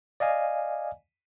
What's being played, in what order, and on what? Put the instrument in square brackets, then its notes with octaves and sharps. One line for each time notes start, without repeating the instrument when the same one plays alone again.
[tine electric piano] D5 D#5 F5 G#5